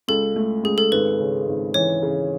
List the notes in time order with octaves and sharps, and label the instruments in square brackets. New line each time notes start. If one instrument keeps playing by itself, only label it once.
[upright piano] C#2 [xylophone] A4
[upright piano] A3
[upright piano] C#2 [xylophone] G#4
[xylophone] A4
[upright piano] G#1 [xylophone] B4
[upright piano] C#3
G#1
[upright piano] E3 [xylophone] C#5
[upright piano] C#3